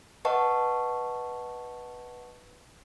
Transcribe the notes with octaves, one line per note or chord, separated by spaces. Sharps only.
B4 D#5 F#5 A5 C#6